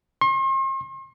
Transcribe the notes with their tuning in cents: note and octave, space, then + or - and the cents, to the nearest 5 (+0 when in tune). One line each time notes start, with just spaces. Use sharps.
C6 +45